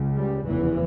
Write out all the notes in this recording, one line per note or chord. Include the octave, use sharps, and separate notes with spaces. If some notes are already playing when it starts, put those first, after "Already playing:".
Already playing: C#2 C#3
G3
F1 E2 C#3 E3